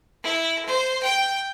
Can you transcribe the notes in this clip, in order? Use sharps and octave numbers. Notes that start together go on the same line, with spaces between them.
E4
C5
G5